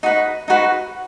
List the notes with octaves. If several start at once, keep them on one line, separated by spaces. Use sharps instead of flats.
D#4 F#4 B4
D#4 F#4 B4